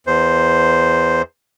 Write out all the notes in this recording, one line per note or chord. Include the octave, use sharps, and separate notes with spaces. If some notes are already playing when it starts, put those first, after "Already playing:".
E2 C5